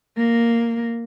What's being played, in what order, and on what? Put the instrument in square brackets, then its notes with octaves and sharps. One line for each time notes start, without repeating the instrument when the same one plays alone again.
[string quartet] A#3